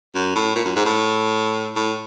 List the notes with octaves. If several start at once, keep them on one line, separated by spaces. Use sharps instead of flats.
F#2
A2
A#2
F#2
G#2
A2
A2